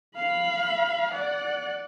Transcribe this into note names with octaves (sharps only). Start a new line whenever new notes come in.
F5 B5
D5 F#5